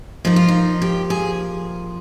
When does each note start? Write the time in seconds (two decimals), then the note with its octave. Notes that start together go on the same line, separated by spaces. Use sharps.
0.25 A#2 F3 D#4
0.36 F4
0.48 D#4
0.82 G4
1.10 G#4